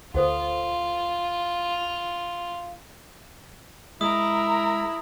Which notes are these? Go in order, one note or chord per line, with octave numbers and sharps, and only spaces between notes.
D2 F4 A4 C5 F#5
G#3 E4 A#4 D#6 A#6